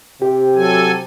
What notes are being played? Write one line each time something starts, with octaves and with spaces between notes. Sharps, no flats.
C3 G4
F#3 A4 G#5